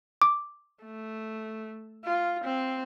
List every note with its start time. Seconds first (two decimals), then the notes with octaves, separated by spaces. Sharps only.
0.22 D6
0.84 A3
2.04 F4
2.45 C4